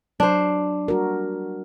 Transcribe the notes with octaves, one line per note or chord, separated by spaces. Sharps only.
F#3 D4 C5
G3 F#4 A#4